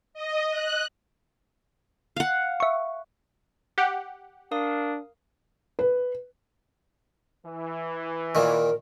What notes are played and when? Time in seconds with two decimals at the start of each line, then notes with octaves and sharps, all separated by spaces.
0.14 D#5
0.51 F#6
2.16 F5 F#5
2.60 E5 C#6
3.78 G4 F#5
4.51 D4 A#4 F5 D#6
5.79 B4
7.46 E3
8.35 A#2 D#3 A#4